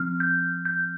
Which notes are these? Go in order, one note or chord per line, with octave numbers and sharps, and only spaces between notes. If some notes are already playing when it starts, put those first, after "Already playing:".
Already playing: F3 C4 F6
G6
G6